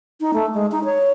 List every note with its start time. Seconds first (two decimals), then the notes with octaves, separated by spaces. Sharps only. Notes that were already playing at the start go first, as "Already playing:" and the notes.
0.21 D#4
0.34 A3
0.54 G#3
0.72 D#4
0.84 C#5